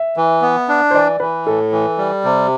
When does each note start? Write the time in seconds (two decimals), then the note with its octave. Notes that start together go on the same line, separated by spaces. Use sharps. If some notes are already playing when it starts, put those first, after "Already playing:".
Already playing: E5
0.17 E3
0.42 B3
0.69 D4
0.91 C5
0.95 E3 D5
1.20 E3 B4
1.47 A2 A4
1.72 E3
1.98 G3
2.25 C3